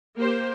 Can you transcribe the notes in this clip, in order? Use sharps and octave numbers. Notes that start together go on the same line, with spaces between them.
A#3 G4 C5